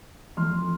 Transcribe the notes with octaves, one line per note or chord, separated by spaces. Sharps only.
F2 F3 A3 C6 F6